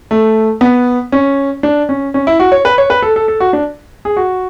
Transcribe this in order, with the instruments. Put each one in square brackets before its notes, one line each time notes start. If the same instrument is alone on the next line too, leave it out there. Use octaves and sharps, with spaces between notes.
[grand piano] A3
B3
C#4
D4
C#4
C#4
E4
F#4
C#5
B4
C#5
B4
A4
A4
A4
F#4
D4
G#4
F#4